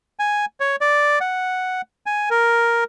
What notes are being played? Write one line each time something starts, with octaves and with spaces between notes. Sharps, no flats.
G#5
C#5
D5
F#5
G#5
A#4